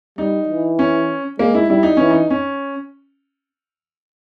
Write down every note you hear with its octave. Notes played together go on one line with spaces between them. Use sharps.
G3 D#4
E3
C#4
G#3 A#3
E4
G3 E4
D#4
E3 C#4
D#4
C#4